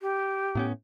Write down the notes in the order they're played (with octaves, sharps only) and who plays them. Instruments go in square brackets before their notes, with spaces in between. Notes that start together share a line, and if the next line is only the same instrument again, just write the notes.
[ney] G4
[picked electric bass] A2 B3 C#4